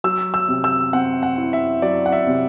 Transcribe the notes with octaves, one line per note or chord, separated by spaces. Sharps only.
F#3 E6
E6
C3
E6
C4 F#5
F#5
E4
E5
F#3 D5
F#5
E5
C3